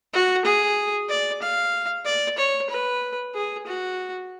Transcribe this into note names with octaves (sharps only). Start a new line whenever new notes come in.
F#4
G#4
D5
F5
D5
C#5
B4
G#4
F#4